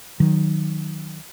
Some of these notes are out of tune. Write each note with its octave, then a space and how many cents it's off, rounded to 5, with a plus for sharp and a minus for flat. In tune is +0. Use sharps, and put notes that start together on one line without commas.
D#3 +0 F#3 -5